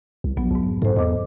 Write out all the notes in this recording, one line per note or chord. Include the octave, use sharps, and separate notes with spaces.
C2
A#1 F#3 B3
B1 F2 G#2
G#2 A4 C5
E2 D#5 D6